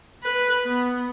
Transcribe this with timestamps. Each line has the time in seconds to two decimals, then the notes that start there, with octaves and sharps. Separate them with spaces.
0.23 B4
0.63 B3